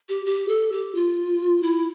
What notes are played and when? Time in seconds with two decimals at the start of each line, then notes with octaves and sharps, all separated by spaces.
0.09 G4
0.26 G4
0.48 A4
0.72 G4
0.95 F4
1.63 E4